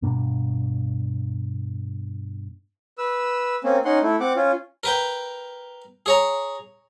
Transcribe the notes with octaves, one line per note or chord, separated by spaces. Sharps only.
G2 B2 A#3 D4
B4 E6
A#3 C4 C#4
C#4 D#4 F#5 C6
A3 E4
C4 F#5 D6
C#4 F4
A#4 B4 G5
G#4 C#5 A#5